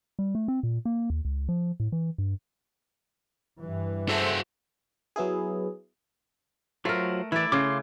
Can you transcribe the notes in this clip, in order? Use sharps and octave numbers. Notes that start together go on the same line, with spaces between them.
G3
A3
C4
A#2
A#3
D#2
C#2
F3
A2
E3
G2
G2 E3
F#4 G#4 A4 C5 E5
F#3 B3 E4 G#4
F#3 A3 F4 A#4 C5
E3 E4 D5
C#3 F5 C6 D6